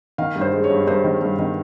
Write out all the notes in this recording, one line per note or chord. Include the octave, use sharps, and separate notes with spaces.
D#3 F5
G2
C5
G#3
C#5
G2
G2 C5
D#3
G2
D#3